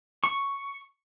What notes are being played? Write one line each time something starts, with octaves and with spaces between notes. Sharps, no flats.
C#6